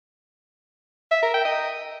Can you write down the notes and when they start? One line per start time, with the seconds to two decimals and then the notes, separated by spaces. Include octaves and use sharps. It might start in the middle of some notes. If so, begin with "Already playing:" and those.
1.11 E5
1.23 A#4
1.34 G5
1.45 D#5